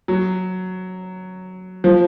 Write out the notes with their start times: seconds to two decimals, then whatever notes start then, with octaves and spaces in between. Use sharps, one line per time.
0.08 F#3
1.84 F3